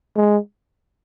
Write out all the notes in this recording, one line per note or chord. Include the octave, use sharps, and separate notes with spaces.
G#3